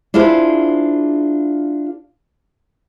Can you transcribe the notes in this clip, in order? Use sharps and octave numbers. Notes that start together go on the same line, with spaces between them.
D4 E4 F4 G#4 C5